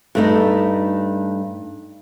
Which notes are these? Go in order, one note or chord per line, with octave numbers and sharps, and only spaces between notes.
G2 A3 D#4